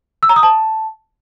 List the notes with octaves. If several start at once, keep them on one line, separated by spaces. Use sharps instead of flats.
E6
A#5
D#6
A5